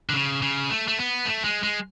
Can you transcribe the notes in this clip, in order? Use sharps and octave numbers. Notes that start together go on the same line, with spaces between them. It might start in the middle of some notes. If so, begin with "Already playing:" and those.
D3
C#3
C#3
A3
A3
B3
A3
G#3
G#3